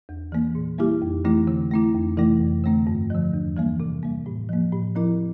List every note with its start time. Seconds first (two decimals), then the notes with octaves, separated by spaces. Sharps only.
0.09 E2
0.32 E3 A#3
0.55 A#2
0.78 G3 A#3 E4 G4
1.02 F2
1.25 E3 A3 C4 E4
1.47 D3
1.71 A3 C4 E4
1.95 F2
2.17 C3 E3 A3 E4
2.41 F2
2.64 D3 A3 C4
2.87 G2
3.10 D3 F3
3.33 E2
3.57 E3 G3 A#3
3.80 C3
4.03 G3 A#3
4.26 A2
4.49 F3 A#3
4.73 A2
4.95 F3 C4 E4 A#4